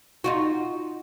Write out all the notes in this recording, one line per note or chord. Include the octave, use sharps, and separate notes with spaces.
D#4 F4 F#4